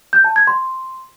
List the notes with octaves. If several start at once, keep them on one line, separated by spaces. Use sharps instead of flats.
G6
A5
G#6
C6